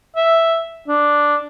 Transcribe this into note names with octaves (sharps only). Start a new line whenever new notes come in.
E5
D4